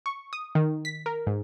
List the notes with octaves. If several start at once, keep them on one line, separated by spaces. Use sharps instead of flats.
C#6
D#6
D#3
B6
A#4
G#2